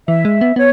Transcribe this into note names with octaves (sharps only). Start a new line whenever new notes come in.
E3 E5
G#3
B3
B3 C#5